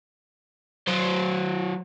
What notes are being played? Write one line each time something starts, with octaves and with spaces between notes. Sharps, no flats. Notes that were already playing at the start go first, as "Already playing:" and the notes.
F#3 C5